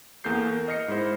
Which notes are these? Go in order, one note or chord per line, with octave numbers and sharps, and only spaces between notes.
E2 A#3 A4 G6 C7
A#4
D#5 F6 A#6 C7 C#7
G#2 G#3 E4 C5